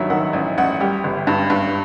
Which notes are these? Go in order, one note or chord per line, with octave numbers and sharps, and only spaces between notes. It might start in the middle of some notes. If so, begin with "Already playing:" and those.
Already playing: A1 G2 D#3 F#3 E5
D#3 F#5
A1
A1 F#5
G3 G4
G1
G2
G2